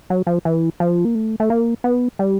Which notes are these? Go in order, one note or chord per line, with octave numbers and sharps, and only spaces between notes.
F#3
F3
E3
F3
A#3
A3
A3
A#3
B3
G3